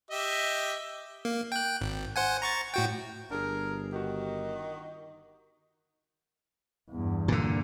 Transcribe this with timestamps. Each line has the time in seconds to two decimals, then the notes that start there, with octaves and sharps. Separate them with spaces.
0.11 G4 D#5 E5
1.25 A#3
1.52 G5 F#6
1.81 G#1
2.16 C5 F#5 G#5
2.42 A#5 C#6 A6
2.74 A2 F#4 G5
3.31 G1 D4 G#4 A#4
3.92 D#3 F#4 G4
6.90 E2 G2
7.28 A#2 D3